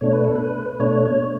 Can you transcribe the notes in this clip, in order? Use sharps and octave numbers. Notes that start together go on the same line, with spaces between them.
B2 A3 D4 C#5
B4
A4
B4
B2 A3 D4 C#5
C#5